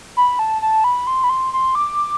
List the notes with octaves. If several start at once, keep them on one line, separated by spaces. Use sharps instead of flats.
B5
A5
A5
B5
C6
B5
C6
C6
D6